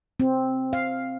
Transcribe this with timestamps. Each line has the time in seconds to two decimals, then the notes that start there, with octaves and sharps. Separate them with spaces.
0.20 C4
0.73 F5